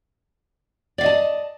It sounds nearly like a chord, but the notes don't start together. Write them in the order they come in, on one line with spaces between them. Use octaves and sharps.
D5 F5 D#5 A5